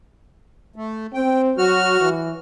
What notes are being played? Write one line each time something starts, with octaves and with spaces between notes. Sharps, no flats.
A3
C4 G5
F#3 F#4 F6
E3